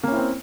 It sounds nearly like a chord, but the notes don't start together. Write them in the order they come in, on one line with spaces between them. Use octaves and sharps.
A#3 C#4 E4 C4